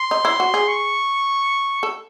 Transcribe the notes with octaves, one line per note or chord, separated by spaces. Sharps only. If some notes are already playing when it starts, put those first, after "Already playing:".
Already playing: C6
D#4
E4
F#4
G#4
C#6
A4